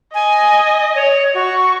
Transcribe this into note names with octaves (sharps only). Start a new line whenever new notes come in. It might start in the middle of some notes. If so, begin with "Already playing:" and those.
D#5 G#5
C#5
F#4 C#6